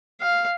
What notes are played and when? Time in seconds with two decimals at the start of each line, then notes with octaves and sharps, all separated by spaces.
0.21 F5